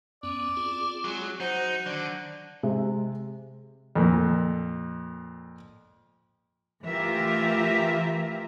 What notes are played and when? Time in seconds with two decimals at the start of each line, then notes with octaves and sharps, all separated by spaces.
0.23 F#2 B3 C#4 D5
0.57 C4 F4 G#4
1.04 F#3 G#3
1.40 F#3 D#4 F#4 C5
1.86 D3 D#3 F#3 D4
2.63 C3 G#3 E5
3.95 F2 A#2
6.84 E3 A3 F4 G4 A#4 E5